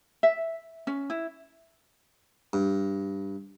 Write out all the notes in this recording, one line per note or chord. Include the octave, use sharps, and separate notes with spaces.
E5
C#4
E4
G2